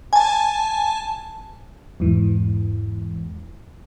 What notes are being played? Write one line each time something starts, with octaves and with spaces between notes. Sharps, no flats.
G#5 A5
E2 G#2 E3